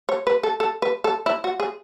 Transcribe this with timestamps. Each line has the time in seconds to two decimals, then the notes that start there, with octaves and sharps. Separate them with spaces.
0.09 C#5
0.27 B4
0.43 A4
0.60 A4
0.82 B4
1.04 A4
1.26 E4
1.44 F#4
1.60 G#4